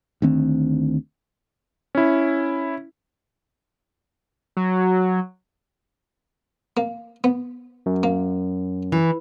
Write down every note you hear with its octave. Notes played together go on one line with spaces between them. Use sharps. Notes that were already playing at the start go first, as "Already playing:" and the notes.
D2 D#3 C4
C#4 E4
F#3
A#3
B3
F#2
A#3
E3